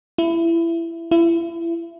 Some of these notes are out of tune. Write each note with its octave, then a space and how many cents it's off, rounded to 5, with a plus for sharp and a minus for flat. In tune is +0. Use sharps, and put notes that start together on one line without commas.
E4 +20
E4 +30